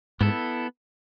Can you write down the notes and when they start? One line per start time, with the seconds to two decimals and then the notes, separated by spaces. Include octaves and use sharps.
0.21 G#2 B3 E4 A4